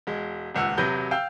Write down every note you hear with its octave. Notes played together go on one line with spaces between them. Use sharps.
E1 G#3
D#1 C#2 F#5 E6
E1 C3 F#3 B4 G6
F5 G5 E6 G6